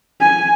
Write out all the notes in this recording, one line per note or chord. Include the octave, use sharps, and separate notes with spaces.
G#5